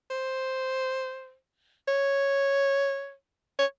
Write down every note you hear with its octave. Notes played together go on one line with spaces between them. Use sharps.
C5
C#5
C#5